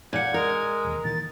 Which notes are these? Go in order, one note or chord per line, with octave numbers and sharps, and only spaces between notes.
A#2 F#5 G#6
G#3 A#4
E1 D#2
A#2 D#3 E3 A6